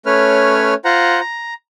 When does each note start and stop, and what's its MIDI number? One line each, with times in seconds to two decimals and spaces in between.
0.06 0.74 57
0.06 0.74 61
0.06 0.74 71
0.06 0.74 73
0.06 0.74 89
0.85 1.20 65
0.85 1.20 72
0.85 1.20 78
0.85 1.20 82
1.20 1.54 82